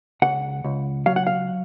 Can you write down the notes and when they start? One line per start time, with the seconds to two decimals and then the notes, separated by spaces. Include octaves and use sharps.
0.22 C#2 F#5
0.64 C#2
1.06 F#3 F5
1.16 F#5
1.27 F5